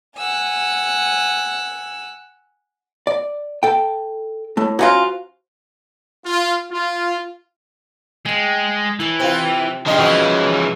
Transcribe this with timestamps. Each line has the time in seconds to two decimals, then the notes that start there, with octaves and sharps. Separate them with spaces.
0.17 F#5 G#5 E6
3.07 D5
3.63 A4 G5
4.57 A2 A3
4.79 F#3 C#4 F4 F#4 C5
6.26 F4
6.71 F4
8.25 G#3 F5 G5
9.00 E3 E4 C#5 A5
9.20 C3 C4 F4 G5 D6
9.86 G2 C#3 F3 D#5
9.99 E3 C#4 F#4